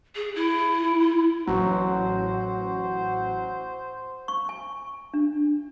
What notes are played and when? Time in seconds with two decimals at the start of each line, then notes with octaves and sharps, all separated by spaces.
0.15 G#4
0.35 E4
1.47 A1 F#3 F#4 C5
4.28 C#6
4.49 G#5
5.14 D4